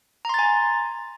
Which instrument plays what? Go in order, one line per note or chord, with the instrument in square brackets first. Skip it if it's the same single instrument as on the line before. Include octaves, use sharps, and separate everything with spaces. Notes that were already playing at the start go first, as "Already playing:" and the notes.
[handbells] A#5
C6
A6
G#5